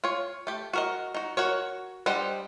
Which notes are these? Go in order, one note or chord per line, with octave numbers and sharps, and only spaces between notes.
F4 C#5
A3 G4
F#4 A#4 D#5
D#4 F#4
F#4 A#4 C#5
G3 D4 C5 D#5 F#5